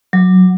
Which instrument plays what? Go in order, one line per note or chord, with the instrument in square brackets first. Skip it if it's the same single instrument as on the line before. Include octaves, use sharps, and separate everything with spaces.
[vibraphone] F#3